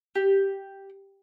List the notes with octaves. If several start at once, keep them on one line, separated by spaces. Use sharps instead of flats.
G4